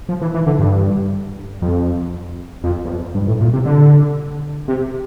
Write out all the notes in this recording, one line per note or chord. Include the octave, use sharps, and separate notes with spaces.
F3
E3
E3
D3
G2
F2
F2
E2
F2
G2
A2
A#2
C3
D3
C3